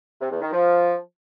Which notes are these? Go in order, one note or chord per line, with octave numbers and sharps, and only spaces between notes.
C3
E2
D#3
F3